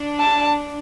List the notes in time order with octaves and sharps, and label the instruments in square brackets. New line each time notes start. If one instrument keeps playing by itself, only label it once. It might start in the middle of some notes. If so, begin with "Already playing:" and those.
Already playing: [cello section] D4
[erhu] A5